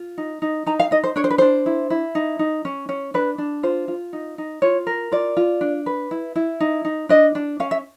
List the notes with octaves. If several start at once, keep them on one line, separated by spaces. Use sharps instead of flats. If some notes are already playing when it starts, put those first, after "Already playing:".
Already playing: F4
D#4
D#4
D#4 A#5
F5
D#4 D#5
C5
D4 C#5
C5
B4
D4 C5
E4
E4
D#4
D#4
C#4
C#4
D4 B4
D4
F4 C5
F4
D#4
D#4
F4 C#5
A#4
F4 D5
F4
D4
B4
E4
E4
D#4
D#4
D4 D#5
D4
C#4 F5
E5